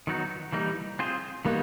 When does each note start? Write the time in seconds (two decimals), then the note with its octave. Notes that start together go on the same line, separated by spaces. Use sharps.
0.07 D#3 F#3 B3 D#4 F#4
0.52 E3 G3 A#3 D#4
0.99 C4 F4 G#4 C5
1.45 D#3 G3 A#3 B3 D#4 F#4